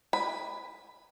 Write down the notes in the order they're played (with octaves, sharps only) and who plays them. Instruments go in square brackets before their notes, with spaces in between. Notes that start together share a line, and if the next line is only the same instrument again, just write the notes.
[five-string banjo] B5